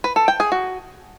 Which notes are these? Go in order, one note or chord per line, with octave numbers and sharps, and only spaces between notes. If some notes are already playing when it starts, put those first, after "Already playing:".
B4
A4
G5
G#4
F#4